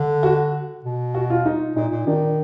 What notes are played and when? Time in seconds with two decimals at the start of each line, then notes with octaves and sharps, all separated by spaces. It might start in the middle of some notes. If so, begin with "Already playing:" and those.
Already playing: D3
0.23 F#4
0.84 B2
1.14 F#4
1.30 F4
1.45 D#4
1.76 A#2 D#4
1.91 A#2
2.07 D#3 D4